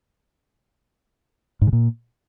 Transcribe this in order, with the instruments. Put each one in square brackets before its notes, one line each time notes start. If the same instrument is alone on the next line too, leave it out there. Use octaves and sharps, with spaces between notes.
[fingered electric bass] G#2
C#3
A#2